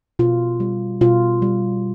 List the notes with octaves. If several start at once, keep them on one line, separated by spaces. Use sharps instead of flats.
B2 F4
G3
B2 F4
G3